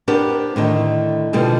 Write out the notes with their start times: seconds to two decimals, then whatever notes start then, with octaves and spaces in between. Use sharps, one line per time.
0.08 B3 D4 G4 A#4 C5
0.56 A2 D3 D#3
1.33 B2 D3 F3 G3 G#3